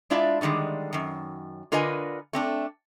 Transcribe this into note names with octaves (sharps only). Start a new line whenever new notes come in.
G#3 D4 E4 F4 D5 E5
A2 D3 D#3 G3 G#3
F#2 D#3
D3 F4 A#4 B4 D#5 G#5
A3 C4 D4